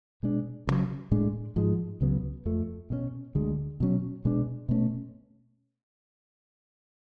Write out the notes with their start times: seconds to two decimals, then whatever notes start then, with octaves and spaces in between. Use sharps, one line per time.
0.23 B2 G#3 D4
0.67 D2 C#3 F#3
1.11 A2 G#3 D4
1.56 G#2 F3 G#3
2.01 C#2 C#3 F#3 B3
2.45 F2 F3 A3
2.90 B2 G#3 C#4
3.35 D2 D3 G#3
3.80 B2 F#3 C#4
4.25 B2 G#3 D4
4.69 B2 A3 C#4